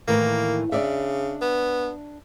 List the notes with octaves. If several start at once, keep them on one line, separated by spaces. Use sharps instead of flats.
A2 D#3 E3 A#3
C#3 D4 D5 E5
B3